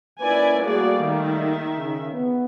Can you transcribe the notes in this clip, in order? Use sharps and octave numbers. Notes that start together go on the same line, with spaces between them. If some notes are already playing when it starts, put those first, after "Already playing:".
A#3 C#4 E4 B4 D5 G#5
G3 A3 A#3 F#4 G#4 D5
D#3 E5
C#3
B3